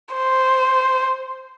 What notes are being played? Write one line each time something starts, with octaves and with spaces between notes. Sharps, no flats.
C5